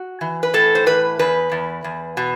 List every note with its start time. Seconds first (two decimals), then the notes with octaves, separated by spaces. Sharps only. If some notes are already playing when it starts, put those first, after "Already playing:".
Already playing: F#4
0.21 E3
0.43 B4
0.54 A2 A4
0.75 C5
0.86 E3 B4
1.19 E2 B4
1.52 E2
1.84 E2
2.17 B2